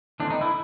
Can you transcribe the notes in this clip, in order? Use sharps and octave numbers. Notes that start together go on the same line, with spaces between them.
E3 A3 C4 D4
D#4
E4